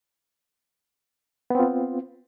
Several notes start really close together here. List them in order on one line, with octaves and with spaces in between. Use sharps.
B3 C4 F4